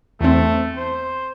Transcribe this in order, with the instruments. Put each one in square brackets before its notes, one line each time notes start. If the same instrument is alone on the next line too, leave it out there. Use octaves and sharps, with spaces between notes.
[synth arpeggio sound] E2 C4 [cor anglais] A3
[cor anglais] C5